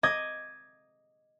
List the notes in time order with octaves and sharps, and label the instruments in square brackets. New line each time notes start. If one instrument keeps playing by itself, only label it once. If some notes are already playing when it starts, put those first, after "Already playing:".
[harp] D#5 D6 D#6 G#6